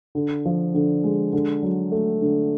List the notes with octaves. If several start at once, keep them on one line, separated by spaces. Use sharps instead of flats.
D3
F3
D3
G#3
D3
F#3
A3
D3